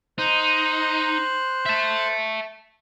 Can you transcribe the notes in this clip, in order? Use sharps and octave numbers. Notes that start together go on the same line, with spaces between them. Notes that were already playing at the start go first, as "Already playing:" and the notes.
D#4 C5 F#6
E5 A5